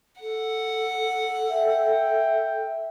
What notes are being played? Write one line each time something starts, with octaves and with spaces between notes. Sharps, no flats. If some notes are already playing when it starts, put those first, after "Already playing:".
A4 F#5
E5 G5